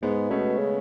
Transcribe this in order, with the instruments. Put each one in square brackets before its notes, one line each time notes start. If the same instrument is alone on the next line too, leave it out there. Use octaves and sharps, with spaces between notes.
[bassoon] G#2 [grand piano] G#3 B3
[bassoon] B2 [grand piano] A3 C#4
[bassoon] C#3